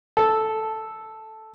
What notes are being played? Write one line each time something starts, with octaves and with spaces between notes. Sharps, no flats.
A4